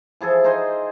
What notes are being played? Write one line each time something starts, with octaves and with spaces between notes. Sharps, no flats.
E3 F3 G#4 A4
D#4 C5 D#5 G#5